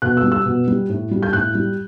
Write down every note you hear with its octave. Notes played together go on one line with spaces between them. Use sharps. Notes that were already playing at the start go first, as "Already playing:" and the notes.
B2 F#6
E6
G3
E6
B2
G3
A2
G3
G6
A2 F#6
G3